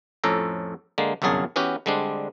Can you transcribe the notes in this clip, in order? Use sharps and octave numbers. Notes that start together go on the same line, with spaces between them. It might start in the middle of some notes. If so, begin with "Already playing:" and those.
F2 A2 C#4 A4 A#5
D3 G#3 A#3
G1 C2 F#2 F#3 G#4 A5
E3 B3 C#4 F#4 G4
D3 G3 G#3 C4 D4